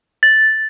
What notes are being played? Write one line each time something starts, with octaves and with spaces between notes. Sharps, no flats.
A6